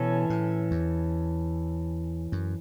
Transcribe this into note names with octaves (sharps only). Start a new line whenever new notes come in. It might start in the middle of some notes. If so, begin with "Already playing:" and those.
Already playing: B2 E3 C#4 A4 C#5
A2
E2
F#2